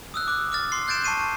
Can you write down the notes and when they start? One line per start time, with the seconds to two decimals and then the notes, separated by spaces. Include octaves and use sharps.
0.14 D#6 E6 F#6
0.28 D6 F#6
0.52 D6 F6 A6
0.72 C6 C7
0.88 F#6 G6 A6 D7 E7
1.04 A5 C#6 C7 D#7